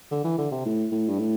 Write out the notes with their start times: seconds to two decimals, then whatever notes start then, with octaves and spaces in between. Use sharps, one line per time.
0.11 D3
0.24 E3
0.38 D3
0.51 C3
0.65 A2
0.92 A2
1.08 G2
1.19 A2